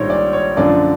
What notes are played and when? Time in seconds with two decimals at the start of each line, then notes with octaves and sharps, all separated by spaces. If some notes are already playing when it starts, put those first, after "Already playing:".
Already playing: A#1 G#2 D#3 G3 C5 C#5
0.10 D5
0.33 C#5
0.56 F#2 D3 F3 A3 D5